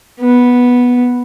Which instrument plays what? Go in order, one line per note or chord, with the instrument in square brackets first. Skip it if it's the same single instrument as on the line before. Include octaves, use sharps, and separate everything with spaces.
[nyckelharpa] B3